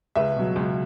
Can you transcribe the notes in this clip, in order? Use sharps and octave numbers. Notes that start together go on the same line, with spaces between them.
C#2 B4 E5
B2 F#3
C#2